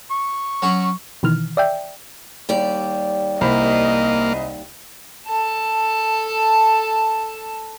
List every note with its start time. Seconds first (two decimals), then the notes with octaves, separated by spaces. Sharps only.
0.11 C#6
0.62 F#3 C#4 F#4
1.23 B2 D#3 E3 F6
1.57 D5 E5 G5
2.49 D#2 G3 D5
3.41 C2 A#3 C5 D#5 B5
5.26 A4 A5